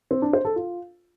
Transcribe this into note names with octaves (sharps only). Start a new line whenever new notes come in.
C4
D4
C5
A4
F4